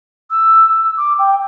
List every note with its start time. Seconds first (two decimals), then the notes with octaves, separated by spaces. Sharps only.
0.30 E6
0.97 D6
1.18 G5